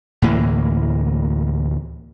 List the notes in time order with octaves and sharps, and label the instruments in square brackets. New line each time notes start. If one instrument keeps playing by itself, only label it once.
[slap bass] D2 A2 E3 A#3